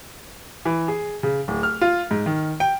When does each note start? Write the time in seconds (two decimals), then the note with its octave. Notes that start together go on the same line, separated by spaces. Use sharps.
0.65 E3
0.88 G#4
1.23 C#3
1.48 D1
1.63 F6
1.81 F4
2.11 G#2
2.26 D#3
2.60 G5